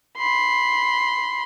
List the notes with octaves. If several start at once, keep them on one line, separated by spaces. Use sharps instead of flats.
B5 C6